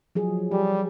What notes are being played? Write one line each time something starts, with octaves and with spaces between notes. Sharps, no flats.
F3 F#3 G#4
G3 G#4